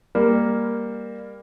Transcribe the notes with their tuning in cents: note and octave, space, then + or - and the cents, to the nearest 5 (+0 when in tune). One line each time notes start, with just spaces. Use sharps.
G3 +25 A#3 +5